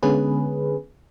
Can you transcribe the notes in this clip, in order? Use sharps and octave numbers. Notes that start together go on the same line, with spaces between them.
D3 G#3 B3 C#4 G#4 B4